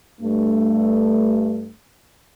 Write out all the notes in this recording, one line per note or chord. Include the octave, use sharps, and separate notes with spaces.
G2 A3